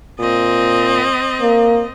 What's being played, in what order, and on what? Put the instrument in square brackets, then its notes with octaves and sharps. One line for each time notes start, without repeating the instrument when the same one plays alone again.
[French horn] A#2 [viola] C4 D#5
[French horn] A#3